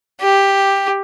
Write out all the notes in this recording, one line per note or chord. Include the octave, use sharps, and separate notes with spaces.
G4